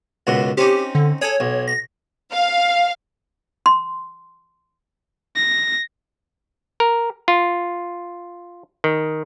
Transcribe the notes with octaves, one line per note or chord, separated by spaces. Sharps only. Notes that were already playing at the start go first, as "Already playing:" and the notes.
C#2 F#2 B2
C4 C#4 D#4 G4
D3
G#4 A4 C#5
B1
A#6
F5
C6
A#6
A#4
F4
D#3